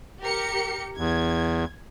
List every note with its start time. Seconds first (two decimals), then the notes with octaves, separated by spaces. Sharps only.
0.22 G4 A#4 C#7
0.98 E2 G#6